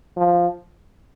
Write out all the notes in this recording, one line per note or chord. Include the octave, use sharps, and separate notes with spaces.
F3